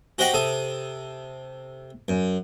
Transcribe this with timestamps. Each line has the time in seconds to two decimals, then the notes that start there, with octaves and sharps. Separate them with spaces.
0.18 F#4 G4 C5 D#5 F#5 G5
0.34 C3 A4 D#6
2.08 F#2